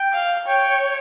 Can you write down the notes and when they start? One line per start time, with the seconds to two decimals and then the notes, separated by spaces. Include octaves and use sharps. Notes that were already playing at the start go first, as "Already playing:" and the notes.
Already playing: G5
0.13 F5
0.47 C#5 G5